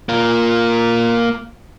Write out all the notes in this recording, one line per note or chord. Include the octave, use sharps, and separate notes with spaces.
A#3 F4